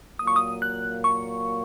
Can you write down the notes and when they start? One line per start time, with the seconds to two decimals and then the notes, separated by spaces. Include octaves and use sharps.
0.19 A#2 F#3 A#3 D#6
0.27 C#6
0.36 D#6
0.62 F#6
1.04 C#6